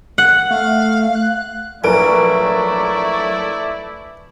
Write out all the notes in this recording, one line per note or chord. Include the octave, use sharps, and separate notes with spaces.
F#5
A3 F5
F#6
A#1 E3 F#3 A3 E4 A#4 D5 D7